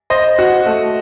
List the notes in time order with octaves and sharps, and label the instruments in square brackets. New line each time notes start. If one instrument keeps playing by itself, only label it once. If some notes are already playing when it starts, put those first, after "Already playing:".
[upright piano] C5 [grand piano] D#5
[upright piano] F#4
A3